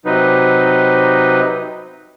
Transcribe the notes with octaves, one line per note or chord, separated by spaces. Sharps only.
C3 F#3 D#4 B4